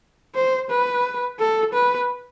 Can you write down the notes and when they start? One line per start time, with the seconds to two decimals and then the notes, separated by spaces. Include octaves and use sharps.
0.35 C5
0.70 B4
1.39 A4
1.73 B4